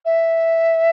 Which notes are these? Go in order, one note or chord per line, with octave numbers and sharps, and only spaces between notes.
E5